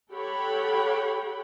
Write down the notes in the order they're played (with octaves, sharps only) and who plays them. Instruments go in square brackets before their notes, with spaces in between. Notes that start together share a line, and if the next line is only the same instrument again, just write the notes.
[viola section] G4 A4 C#5 F#5 G5 B5